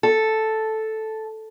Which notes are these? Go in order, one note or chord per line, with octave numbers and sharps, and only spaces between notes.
A4